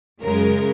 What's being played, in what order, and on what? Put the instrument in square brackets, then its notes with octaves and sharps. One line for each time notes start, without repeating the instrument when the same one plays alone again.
[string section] F#2 C#3 G#3 A#4